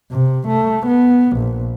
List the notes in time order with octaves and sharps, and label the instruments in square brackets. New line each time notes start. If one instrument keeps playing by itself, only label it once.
[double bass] C3
A3
B3
A#1